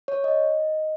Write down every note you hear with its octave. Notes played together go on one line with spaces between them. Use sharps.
C#5
D#5